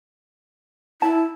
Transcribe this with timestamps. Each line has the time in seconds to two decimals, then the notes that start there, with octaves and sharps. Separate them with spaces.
1.02 E4 A5